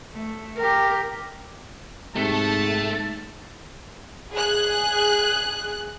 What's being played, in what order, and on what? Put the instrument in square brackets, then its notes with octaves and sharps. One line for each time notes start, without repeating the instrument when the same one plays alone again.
[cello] A3
G4 A#4
[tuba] G#2 [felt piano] C3 [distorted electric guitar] A3 [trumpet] A5
[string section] G#4 F#6